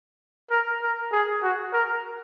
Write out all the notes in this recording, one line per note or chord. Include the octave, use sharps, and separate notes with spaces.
A#4
A#4
G#4
F#4
A#4